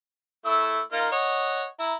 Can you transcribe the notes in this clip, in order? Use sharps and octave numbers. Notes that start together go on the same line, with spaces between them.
A3 E4 E6
A#3 D#4 F4
C#5 D#5 F#5
E4 A#5